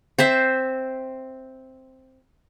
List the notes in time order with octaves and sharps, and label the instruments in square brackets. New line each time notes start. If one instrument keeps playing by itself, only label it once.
[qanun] C4 C5 E5